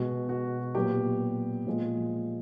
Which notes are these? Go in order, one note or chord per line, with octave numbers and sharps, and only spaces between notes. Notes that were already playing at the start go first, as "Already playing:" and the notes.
Already playing: B2 G#3 B3 F#4
F#4
A#2 F#3 B3 G4
A#2 F3 G#3